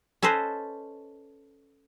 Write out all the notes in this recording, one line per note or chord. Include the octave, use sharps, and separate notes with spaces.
C#4 A4 B4 C5 D#5